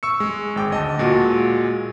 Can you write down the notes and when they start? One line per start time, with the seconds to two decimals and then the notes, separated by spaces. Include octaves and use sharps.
0.03 C#6 E6 C#7
0.20 G#3
0.56 G#1 G5 D6
0.70 D2 D#5 A5
0.99 A#2 G#3 F#4